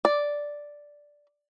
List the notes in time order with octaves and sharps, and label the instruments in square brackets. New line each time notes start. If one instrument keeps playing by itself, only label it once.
[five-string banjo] D5